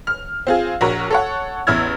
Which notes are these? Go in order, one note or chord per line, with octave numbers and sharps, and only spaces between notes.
F6
C4 F4 G#4
A#1 F#4 A#4 C#5 A#5
A4 C#5 F#5
A1 E2 E4 E6 F6 G#6